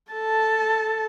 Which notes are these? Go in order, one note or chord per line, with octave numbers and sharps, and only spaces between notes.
A4 A5